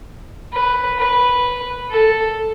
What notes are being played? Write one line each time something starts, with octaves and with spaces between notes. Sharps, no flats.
B4
B4
A4